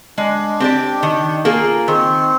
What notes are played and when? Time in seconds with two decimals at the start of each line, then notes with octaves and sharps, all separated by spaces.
0.17 G#3 D4
0.60 C4 G4 D5
1.03 D#3
1.45 A#3 F4 G#4
1.87 D#3 C4